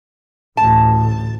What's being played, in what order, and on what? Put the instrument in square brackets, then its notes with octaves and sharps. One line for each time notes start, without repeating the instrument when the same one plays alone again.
[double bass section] A1 D2 A2 [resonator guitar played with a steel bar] A5